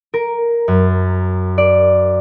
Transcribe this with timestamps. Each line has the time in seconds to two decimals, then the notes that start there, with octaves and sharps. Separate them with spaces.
0.14 A#4
0.68 F#2
1.58 D5